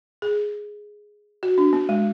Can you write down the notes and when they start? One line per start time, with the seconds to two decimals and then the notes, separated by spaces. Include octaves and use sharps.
0.22 G#4
1.43 F#4
1.58 D4
1.73 B3
1.89 G#3